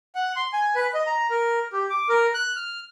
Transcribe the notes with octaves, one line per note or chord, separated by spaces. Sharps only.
F#5
C6
G#5
B4
D#5
A#5
A#4
G4
D6
A#4
F#6
F6